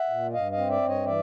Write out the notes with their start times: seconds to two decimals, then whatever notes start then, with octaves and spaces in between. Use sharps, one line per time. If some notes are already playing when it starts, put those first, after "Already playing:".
Already playing: E5 F#5
0.10 A#2
0.33 G2 D#5 F5
0.51 D#5 F5
0.58 C4
0.69 D5 E5
0.82 G2
0.88 C#5 D#5
1.05 E3 D5 E5